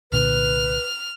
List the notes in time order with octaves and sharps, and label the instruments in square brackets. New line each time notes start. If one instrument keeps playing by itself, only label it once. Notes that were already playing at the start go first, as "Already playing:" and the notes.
[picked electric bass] C2 A#2 D3 [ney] B4 [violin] F6